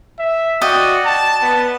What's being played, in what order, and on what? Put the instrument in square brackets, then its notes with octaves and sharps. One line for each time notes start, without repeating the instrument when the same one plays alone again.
[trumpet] E5
[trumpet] F#4 [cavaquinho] D5 D#5 G5
[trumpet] A5
B3